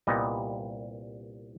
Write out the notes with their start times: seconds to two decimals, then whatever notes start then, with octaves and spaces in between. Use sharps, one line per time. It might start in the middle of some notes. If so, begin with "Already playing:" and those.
0.07 C2 A#2 G3 B3 D#5